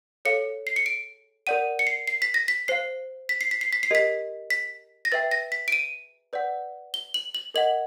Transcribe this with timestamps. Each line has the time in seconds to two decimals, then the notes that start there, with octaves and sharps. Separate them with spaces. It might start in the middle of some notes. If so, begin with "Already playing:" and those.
0.25 A4 C#5 F5 C#7
0.67 C7
0.76 C#7
0.86 D7
1.47 A#4 D5 F#5 D#7
1.79 C#7
1.87 C7
2.08 C7
2.22 B6
2.34 A#6
2.48 B6
2.68 C5 F5 C7
3.29 B6
3.41 C7
3.51 B6
3.61 C7
3.73 B6
3.83 C7
3.91 G4 A#4 D#5 B6
4.50 B6
5.05 A#6
5.12 B4 E5 G5 A6
5.31 A#6
5.52 B6
5.68 D7
5.72 D#7
6.33 B4 D5 F#5
6.94 G7
7.14 F#7
7.35 F#7
7.54 A#4 D#5 F#5 F#7